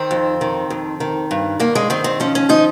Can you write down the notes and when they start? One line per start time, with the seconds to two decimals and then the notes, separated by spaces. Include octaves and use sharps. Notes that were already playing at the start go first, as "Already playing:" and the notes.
Already playing: D#3 C4
0.11 F2
0.41 D#3
0.70 F2
1.00 D#3
1.31 G2
1.60 G2 A#3
1.75 G#3
1.90 D#3 C4
2.04 C4
2.20 F3 C#4
2.35 C#4
2.49 F3 D#4